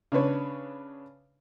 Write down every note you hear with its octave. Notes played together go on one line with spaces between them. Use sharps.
C#3 D4 B4 C#5